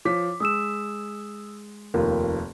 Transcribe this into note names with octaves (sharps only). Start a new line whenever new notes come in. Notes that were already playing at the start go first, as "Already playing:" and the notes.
F3 C#5 D6 B6
G#3 D#6 E6 E7
F1 D#2 F4 A#4